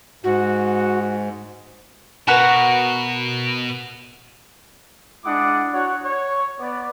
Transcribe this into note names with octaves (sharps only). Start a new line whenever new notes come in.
G#2 F#4
B2 F#4 A#4 B4
G#3 D4 E4 F#5 D6 D#6
D4 F#4 C#5 F#5
C#5
B3 D5